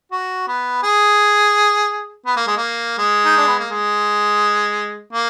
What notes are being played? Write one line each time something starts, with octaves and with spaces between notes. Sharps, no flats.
F#4
B3
G#4
B3
A#3
G#3
A#3
G#3
D#4
D4
B3
A#3
G#3
A#3